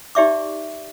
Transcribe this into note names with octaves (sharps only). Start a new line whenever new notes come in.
D#4 G4 D5 E5 C#6 D6